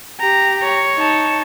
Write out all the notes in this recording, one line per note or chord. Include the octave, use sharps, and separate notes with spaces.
G4 A#5
C#5
D#4 A5